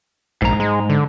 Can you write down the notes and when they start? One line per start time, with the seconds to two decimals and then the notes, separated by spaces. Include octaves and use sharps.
0.42 A#1 G#2 A#5
0.60 G#3
0.89 D3